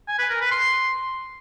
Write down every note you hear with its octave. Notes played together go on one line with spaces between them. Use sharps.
G#5
B4
A#4
B4
C6